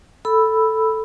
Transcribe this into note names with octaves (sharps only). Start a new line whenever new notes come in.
A4 B5 E6